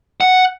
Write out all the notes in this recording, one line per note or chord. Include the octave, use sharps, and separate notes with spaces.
F#5